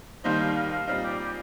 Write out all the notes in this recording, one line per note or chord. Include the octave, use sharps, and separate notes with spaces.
D#2 D#3 G3 A#3 D#4 C5
F5
F5
F5
A#2 G3 C4 D#4 F5
G4
G4